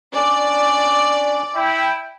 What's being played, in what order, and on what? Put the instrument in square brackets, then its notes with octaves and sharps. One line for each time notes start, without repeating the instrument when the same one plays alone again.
[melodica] C#4 D4 [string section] D5
[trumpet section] E4 G5